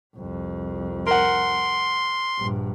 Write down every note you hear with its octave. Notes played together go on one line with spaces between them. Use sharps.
C2 F2
A#4 F#5 C6
A#1 G2